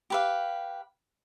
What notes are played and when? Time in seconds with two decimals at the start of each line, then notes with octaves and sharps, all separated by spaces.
0.10 G4 B4 F5